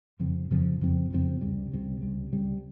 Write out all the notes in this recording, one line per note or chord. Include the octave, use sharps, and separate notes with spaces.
F2 C#3 F3 C4
F2 C#3 F3 C4
F2 C#3 F3 C4
F2 C#3 F3 C4
C#2 C3 G3
C#2 C3 G3
C#2 C3 G3
C#2 C3 G3